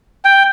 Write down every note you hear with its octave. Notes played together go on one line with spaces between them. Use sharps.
G5